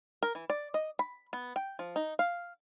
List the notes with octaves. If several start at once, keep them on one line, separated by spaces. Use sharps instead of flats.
A#4
E3
D5
D#5
B5
B3
G5
F3
D#4
F5